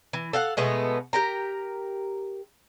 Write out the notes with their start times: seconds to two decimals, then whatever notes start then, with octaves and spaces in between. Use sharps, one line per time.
0.13 E3
0.33 A4 F5 F#5
0.57 B2 G#3 A3 B3
1.13 G4 A#4 A#5